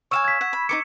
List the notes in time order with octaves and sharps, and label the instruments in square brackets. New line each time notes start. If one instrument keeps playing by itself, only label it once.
[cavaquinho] C#5 F5 G#5 [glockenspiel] C#6 E6 E7
[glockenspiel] G#6 B6
[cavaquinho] F#5
B5
[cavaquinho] D#4 A#4 D6 [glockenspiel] C#7